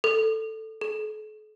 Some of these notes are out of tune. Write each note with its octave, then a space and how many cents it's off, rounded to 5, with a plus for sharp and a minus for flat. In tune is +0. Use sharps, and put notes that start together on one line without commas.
A4 +5
A4 -45